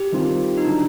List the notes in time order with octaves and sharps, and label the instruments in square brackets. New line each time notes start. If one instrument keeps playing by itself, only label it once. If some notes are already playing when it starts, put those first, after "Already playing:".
Already playing: [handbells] G4
[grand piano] D#3 G3 C4 F4
[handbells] D#4
[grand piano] D3 F#3 [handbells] D4